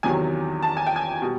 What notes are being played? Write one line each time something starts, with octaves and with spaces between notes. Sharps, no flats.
E2 C3 D#3 F#3 G#5
A5
G#5
G5
G#5
B2 G3